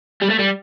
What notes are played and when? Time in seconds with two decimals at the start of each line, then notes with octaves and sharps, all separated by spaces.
0.21 G3
0.30 A3
0.39 G3